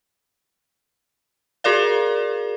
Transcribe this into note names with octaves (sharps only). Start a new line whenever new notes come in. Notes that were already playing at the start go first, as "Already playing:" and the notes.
F#4 G#4 A#4 D5 F5